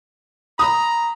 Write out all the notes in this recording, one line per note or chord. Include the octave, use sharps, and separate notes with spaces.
A#5 B5 D#6